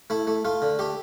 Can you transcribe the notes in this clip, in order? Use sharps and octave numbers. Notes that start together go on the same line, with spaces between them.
A3 E4
A3
A3 F4
D3
A3 G4